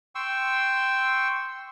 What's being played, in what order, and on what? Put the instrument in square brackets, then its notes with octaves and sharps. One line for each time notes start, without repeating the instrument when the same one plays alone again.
[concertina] G5 C6 C#6 E6